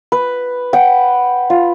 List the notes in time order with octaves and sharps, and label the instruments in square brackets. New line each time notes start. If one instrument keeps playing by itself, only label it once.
[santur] B4
F#5 G5
F4